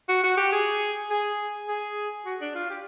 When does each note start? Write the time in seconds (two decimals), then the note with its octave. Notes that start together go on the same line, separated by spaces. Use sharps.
0.09 F#4
0.24 F#4
0.38 G4
0.53 G#4
1.11 G#4
1.68 G#4
2.26 F#4
2.41 D4
2.55 F4
2.70 G4